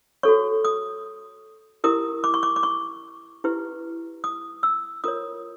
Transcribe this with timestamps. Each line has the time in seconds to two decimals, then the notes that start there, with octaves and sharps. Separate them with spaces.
0.23 F#4 A4 C#5 C#6
0.65 D#6
1.84 E4 G4 A#4 D#6
2.24 D6
2.34 C#6
2.43 D6
2.56 D6
2.63 C#6
3.44 E4 G4 B4
4.24 D#6
4.63 E6
5.04 F4 A#4 C#5 D#6